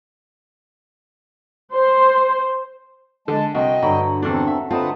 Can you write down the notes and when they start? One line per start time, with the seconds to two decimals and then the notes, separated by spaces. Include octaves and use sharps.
1.74 C5
3.28 D3 G#3 A5
3.55 C2 F#4 D#5 G5
3.83 G2 D3 F#3 B5
4.22 E2 C4 D4 A4
4.47 E5
4.70 D3 C4 F4 A4 B4 D#5 E5 F#5